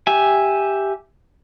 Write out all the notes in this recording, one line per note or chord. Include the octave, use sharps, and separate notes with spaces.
G4 E5 G#5